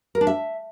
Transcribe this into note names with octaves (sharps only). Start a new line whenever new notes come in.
A#4
D4
E5